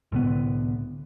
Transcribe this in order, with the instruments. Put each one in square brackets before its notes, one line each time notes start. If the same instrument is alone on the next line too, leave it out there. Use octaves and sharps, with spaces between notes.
[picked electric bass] C2 A2 D3 B3